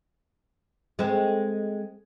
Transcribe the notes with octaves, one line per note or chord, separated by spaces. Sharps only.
G#3 A3 C4